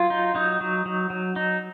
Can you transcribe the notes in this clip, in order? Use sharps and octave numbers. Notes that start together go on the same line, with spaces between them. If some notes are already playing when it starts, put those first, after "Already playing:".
Already playing: F#3 F4
D#4
F#3 D#4
F#3
F#3
F#3
D#4